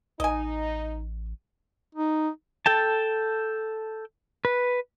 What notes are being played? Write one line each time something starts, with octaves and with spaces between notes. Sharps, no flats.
A1 D#4 D#5 G#5
D#4
A4 G5 A5
B4